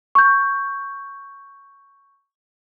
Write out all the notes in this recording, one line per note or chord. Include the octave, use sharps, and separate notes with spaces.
C#6 G6